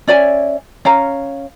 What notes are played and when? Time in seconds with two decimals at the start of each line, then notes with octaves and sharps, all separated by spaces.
0.07 C#4 D5 E5 G#5
0.85 C#4 F5 A#5